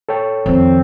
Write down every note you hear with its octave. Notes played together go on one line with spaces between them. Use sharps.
A4 C#5 G5
F2 D#3 C4